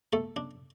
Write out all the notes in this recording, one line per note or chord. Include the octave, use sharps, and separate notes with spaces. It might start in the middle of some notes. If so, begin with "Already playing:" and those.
A3 A4
D4